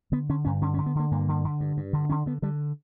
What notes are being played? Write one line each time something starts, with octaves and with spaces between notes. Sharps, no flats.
D3 B3
D3 C#4
G2 C#4
D3 C#4
C#4
D3
B3
D3 A#3
G2 A#3
D3
D3
G2
G2
D3
D3 C#4
D3 B3
D3 G3